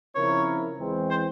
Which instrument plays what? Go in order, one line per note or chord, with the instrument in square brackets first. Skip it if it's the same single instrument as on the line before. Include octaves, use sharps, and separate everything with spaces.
[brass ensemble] C#3 F3 C4 E4 A#4 [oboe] C#5
[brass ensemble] E2 E3 G#3 C4
[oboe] C5